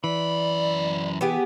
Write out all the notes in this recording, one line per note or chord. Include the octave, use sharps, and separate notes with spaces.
F#2 E3 D5 B5
B3 G4 G#4